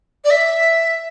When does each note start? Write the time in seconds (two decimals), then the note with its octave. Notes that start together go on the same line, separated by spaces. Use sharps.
0.24 D5
0.30 E5